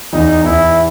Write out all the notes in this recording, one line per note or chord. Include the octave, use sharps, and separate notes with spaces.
E2 E3 D#4
E2 E3 E4